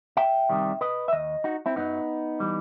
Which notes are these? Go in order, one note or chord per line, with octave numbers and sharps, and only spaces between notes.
E5 G5
C2 C3 D#3 G3
B4 D#5
E5
D#2 D#3 D#5
D#4 F#4
C4 E4
F#2 F#3 B3 D#4
E3 G3